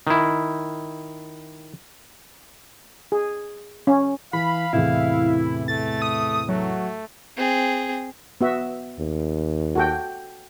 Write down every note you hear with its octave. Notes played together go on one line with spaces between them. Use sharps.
D#3 E4
G#4
C#4
E3 F5 B5
E2 A2 C3 E4
A3 A6
D#6
F#3 A3
C4 G#4
B3 F#4 E5
D#2
F#4 A4 G5